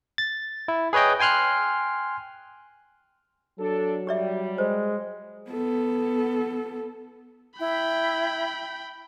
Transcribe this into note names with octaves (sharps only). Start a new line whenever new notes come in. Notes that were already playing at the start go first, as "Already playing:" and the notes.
A6
E4
G#4 B4 C#5 D#5 G5
G5 G#5 C6 F6 F#6
F#3 D4 A4
G3 G4 D5 E5
G#3 C5
B3 A4
E4 G5 B5